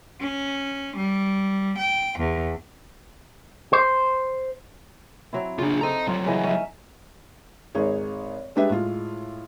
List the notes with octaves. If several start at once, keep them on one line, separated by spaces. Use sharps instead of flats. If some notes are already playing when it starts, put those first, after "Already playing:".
C#4
G3
G5
E2
C5
F#3 C4 E4
C#3 D4 F4
C4 A4 D#5 A#5
F#3 G3 F4
C#3 E3 D#5
C#4 D#4 E5
G#1 D#4 G#4 C#5
G3 G#3 D4 G4 B4 E5
A2 G#3 F4